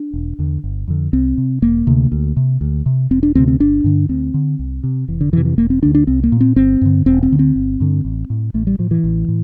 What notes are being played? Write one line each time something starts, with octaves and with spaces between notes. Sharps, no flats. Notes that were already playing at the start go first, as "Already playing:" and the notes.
Already playing: D4
E1
E2 D3
G1
F2 D3
C2 C4
C3
E1 A#3
D2 C3
D2
C3
D2
C3
E1 C4
D4
D2 C3 C4
C4
G1 D4
G2 D3
D2 C4
D3
C2
C3
F1 E3
D3
F2 C3 E3
E3
E1 A#3
C4
D2 D3 D4
D4
C2 C4
A#3
A#2
C4
G1 C4
G2 D3
E1 C4
C4
D2 D3
C4
G1
G2 D3
A1
A2
A1 A3
G3
A2 F3
E3
A1
A2